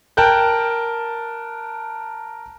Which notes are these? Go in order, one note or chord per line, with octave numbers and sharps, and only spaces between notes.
A#4 G5 A5 F#6 G6